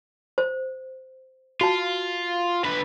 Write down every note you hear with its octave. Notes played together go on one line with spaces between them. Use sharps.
C5
F4 F#4 A5
D3 B4